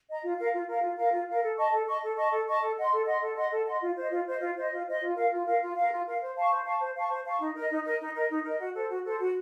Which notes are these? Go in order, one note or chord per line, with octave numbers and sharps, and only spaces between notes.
D#5 A#5
F4
A#4 F5
F4
A#4 F5
F4
A#4 F5
F4
A#4 F5
A4
D#5 A5 C#6
A4
D#5 A5 C#6
A4
D#5 A5 C#6
A4
D#5 A5 C#6
A4
D#5 F#5 C6
A4
D#5 F#5 C6
A4
D#5 F#5 C6
A4
D#5 F#5 C6
F4
C5 D#5
F4
C5 D#5
F4
C5 D#5
F4
C5 D#5
F4
A#4 F5
F4
A#4 F5
F4
A#4 F5
F4
A#4 F5
C5
F5 A5 C#6
C5
F5 A5 C#6
C5
F5 A5 C#6
C5
F5 A5 C#6
D#4
A#4 D#5
D#4
A#4 D#5
D#4
A#4 D#5
D#4
A#4 D#5
F#4
A4 C5
F#4
A4 C5
F#4